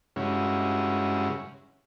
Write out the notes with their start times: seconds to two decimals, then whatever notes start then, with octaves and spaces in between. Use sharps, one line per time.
0.16 G2 C#3 G#3 C#4 E4 F#4